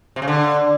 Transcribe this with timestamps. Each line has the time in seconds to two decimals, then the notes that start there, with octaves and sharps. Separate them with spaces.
0.16 C3
0.22 C#3
0.28 D3